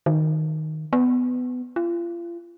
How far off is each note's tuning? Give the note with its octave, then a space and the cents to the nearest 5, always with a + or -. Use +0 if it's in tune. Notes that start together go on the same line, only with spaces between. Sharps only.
D#3 +0
B3 +20
F4 -35